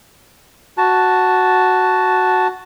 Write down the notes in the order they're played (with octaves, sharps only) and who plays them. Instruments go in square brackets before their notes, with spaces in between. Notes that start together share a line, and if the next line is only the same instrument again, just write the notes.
[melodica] F#4 A5